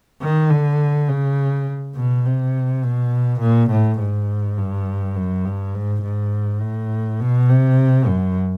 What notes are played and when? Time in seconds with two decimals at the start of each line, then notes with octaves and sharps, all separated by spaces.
0.21 D#3
0.50 D3
1.08 C#3
1.95 B2
2.25 C3
2.82 B2
3.40 A#2
3.71 A2
3.99 G#2
4.58 G2
5.16 F#2
5.45 G2
5.74 G#2
6.03 G#2
6.61 A2
7.20 B2
7.49 C3
8.07 F#2